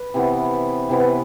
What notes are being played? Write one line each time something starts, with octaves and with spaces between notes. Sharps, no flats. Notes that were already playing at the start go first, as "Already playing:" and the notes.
Already playing: B4
C3 E3 B3
C3 E3 B3